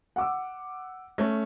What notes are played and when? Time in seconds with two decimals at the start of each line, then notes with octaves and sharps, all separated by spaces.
0.16 F#5 D6 E6
1.18 A3 C#4 G#6